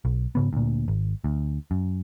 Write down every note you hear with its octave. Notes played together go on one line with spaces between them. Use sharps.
B1
G#2 C#3 B3
D2 A#2
G#1
D2
F#2